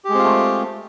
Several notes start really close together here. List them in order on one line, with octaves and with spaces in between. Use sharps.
G4 G#3 C4 F4 A3